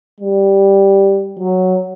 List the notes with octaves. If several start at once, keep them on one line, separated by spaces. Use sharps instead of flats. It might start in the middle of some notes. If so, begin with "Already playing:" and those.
G3
F#3